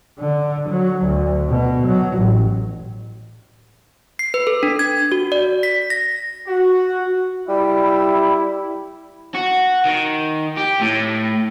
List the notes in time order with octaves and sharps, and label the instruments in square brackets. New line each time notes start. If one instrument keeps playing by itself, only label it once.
[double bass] D3
F#3
D2
B2
F#3
A1
[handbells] C7
B4
A4
D4
G#6
F#4
D5
B6
A#6
[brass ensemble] F#4
[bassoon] G3 [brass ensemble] E4
[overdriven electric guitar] F#4
D#3
G4
A2